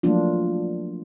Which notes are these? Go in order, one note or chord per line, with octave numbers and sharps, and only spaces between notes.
F3 F#3 A3 A#3 D4 F4